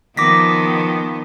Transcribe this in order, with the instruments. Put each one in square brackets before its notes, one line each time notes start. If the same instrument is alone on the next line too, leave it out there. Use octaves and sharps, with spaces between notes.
[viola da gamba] D#3 F3 B3 [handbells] D6 A#6 B6